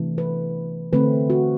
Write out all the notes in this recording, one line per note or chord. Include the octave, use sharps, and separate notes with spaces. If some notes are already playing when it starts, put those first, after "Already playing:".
Already playing: C3 E3 A3 D4
B4
D3 A3 C4 B4
F#4